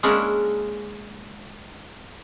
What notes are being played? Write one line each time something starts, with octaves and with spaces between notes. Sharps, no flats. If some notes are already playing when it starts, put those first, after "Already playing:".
G#3 A#3 C#4 D4 E4